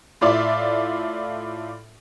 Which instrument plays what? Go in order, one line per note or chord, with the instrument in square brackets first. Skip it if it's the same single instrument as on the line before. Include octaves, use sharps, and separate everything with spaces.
[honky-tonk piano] A2 F4 D5 E5